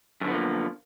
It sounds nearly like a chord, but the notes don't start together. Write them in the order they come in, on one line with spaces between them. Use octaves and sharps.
F#2 D3 B3 F3 A#3